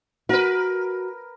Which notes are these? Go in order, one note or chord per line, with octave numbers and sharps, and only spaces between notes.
F#4 A#4 B4